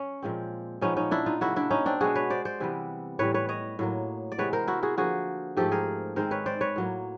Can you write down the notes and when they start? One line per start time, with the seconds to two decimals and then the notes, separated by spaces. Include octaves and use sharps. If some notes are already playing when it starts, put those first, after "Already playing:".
Already playing: C#4
0.22 A#2 F3 G#3 C4
0.81 A#2 F3 G#3 B3 C#4 D#4
0.97 C#4 D#4
1.11 D4 E4
1.26 D#4 F4
1.41 C#3 F#3 A#3 E4 F#4
1.56 D4 E4
1.70 C#4 D#4
1.86 C4 D4
2.00 B2 G#3 B3 F#4 G#4
2.15 B4 C#5
2.30 C5 D5
2.45 C5 D5
2.60 C3 E3 G3 B3
3.19 A2 E3 G3 B4 C#5
3.34 B4 C#5
3.49 C#5 D#5
3.79 A2 F#3 A#3
4.32 D5
4.38 C3 E3 G#3 B3 B4 C#5
4.53 A#4 C5
4.68 E4 F#4
4.83 F#4 G#4
4.97 D3 F3 A#3 F#4 G#4
5.57 G#2 F3 A3 C4 G4 A4
5.71 G#4 A#4
6.16 D#3 G#3 C4 A#4 C5
6.31 B4 C#5
6.46 C5 D5
6.61 B4 C#5
6.76 A2 F#3 A#3